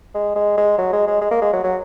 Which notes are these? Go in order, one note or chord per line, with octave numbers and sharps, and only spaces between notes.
G#3
G#3
G#3
F#3
G#3
G#3
G#3
A#3
G#3
F#3
F#3